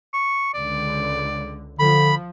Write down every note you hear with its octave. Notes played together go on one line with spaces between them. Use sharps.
C#6
C#2 D3 D5
D3 F3 B5